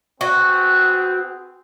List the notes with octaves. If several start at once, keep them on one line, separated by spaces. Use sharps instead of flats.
B3 C4 F#4 G#4